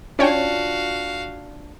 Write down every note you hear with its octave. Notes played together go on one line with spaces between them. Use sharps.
C#4 D4 F4 F#4 C#5 D5 F5 G5